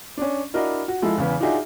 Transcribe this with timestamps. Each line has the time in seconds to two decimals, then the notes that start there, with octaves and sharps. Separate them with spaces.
0.18 C#4 D4
0.54 D4 E4 F#4 A#4 D#5
0.88 F#4
1.02 F3 G#3 E4 A4
1.18 E2 C#3 B3
1.40 D4 D#4 F4 F#4 G#4 E5